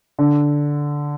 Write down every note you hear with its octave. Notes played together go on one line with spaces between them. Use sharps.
D3